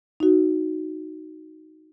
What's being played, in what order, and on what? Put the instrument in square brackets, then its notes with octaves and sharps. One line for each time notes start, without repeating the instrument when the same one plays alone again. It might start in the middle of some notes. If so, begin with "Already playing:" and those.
[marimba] D#4 F#4